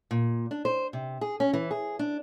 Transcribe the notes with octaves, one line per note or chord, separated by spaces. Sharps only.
A#2
D4
C5
C3
G#4
C#4
E3
G#4
D4